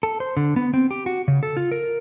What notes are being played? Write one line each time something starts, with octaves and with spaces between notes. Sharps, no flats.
A4
C5
D3
B3
C4
G4
F#4
C#3
A4
F4
A#4